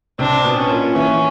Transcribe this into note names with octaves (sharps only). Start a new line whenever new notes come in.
C3 C4 D4
B2 B3
C#4
A#2 A#3
E3 C#4 E4